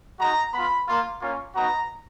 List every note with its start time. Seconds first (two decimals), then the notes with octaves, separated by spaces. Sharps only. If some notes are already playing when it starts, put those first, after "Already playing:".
0.18 G#3 D#4 F#4 A#5
0.53 B3 F4 B5
0.87 A#3 F4
1.21 A#3 C#4 F4
1.55 B3 D#4 F#4 A#5